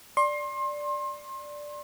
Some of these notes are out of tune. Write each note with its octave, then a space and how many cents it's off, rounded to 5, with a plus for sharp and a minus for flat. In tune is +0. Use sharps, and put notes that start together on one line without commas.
D5 +0 C6 +30